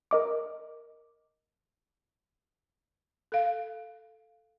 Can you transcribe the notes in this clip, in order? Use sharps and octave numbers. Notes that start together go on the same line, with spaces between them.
A#4 D#5 D6
A4 F5